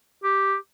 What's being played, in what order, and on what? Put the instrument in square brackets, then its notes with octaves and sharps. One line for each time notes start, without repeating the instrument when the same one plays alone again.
[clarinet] G4